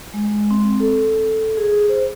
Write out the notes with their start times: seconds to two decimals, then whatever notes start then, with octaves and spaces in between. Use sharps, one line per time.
0.14 G#3
0.51 C4
0.80 A4
1.57 G#4
1.89 C5